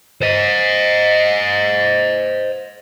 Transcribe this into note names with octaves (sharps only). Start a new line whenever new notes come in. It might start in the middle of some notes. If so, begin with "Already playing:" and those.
C5 D#5